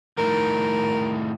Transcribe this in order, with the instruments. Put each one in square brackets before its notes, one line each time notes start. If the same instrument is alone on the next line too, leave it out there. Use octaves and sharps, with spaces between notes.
[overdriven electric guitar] A2 D#3 [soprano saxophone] A#4